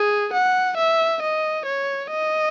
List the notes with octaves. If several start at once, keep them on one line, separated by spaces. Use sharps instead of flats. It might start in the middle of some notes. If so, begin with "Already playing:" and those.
Already playing: G#4
F#5
E5
D#5
C#5
D#5